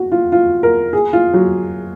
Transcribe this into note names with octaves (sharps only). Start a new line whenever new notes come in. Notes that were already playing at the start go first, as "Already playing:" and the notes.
Already playing: F#4
F4
F4
A#4
G#4
F4
F#3